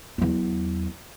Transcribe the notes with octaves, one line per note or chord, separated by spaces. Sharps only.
E2 F#3